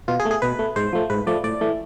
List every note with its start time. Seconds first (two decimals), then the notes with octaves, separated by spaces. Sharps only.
0.08 B2 F4
0.20 G#4
0.25 A3
0.31 G#4
0.42 B2 B4
0.59 A3
0.76 G#2 C5
0.93 F3 A3
1.10 G#2 B4
1.27 F3 A3 D5
1.44 A2 D5
1.61 E3 A3